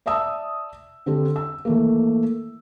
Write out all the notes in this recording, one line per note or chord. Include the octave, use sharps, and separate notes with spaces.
D5 E5 A5 D#6 E6
D3 C4 G4 A4
E6
E3 A3 A#3